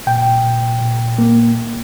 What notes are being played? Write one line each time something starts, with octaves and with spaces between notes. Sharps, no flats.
A#2 G5
A#2
A#2
A#3